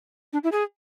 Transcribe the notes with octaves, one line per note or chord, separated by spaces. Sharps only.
D4
E4
G#4